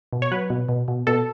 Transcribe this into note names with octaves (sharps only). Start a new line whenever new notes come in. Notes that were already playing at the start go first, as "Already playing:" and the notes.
B2
C#5
F#3 B4
B2
B2
B2
B2 A4